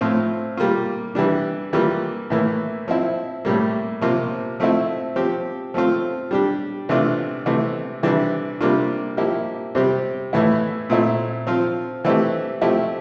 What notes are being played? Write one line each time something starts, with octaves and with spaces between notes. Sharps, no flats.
A2 F3 C4 F4
G3 A#3 F4
E3 G3 D4
E3 G3 A#3 F4
A2 E3 A#3
F3 C4 E4
A2 G3 A#3
C3 F3 A#3 F4
F3 A3 C4 E4
F3 C4 G4
F3 A3 C4 F4
G3 D4 G4
C3 E3 A3 D4 F4
C3 E3 A3 E4
C3 E3 G3 D4
C3 G3 A#3 D4 F4
F3 A#3 E4 G4
C3 G3 C4 G4
A2 E3 A3 E4
A#2 A3 C4 E4
F3 C4 F4
E3 A3 C4 E4 G4
F3 A3 C4 E4 G4